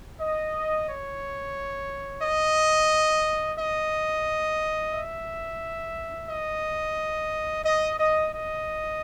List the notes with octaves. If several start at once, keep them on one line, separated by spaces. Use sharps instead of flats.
D#5
C#5
D#5
D#5
E5
D#5
D#5
D#5
D#5